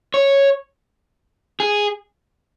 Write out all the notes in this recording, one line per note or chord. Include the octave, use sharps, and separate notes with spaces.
C#5
G#4